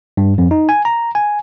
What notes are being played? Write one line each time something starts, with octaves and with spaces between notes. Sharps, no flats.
G2
F2
D#4
G#5
A#5
G#5